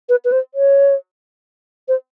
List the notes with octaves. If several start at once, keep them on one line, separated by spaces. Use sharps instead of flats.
B4
B4
C5
C#5
C5